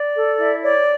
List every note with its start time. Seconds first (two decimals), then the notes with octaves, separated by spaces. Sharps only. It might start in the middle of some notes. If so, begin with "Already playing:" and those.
Already playing: D5
0.14 A4
0.38 E4
0.63 C#5 D5